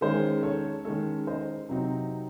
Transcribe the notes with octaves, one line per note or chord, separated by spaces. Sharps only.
D#3 G#3 C#4 G#4 C5
A4 C#5
D#3 G#3 C#4 A4 C#5
C5 D#5
C3 F#3 C4 D#4